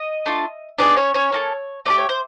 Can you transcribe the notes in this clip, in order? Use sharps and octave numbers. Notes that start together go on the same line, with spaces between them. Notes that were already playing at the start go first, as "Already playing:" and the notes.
Already playing: D#5
A3 D4 F4
B3 D4 D#4 G#4 D5
C#4 C#5
C#4 C#5
A#3 C#4 F#4 A4
A3 D4 G4 D5
C#5
C5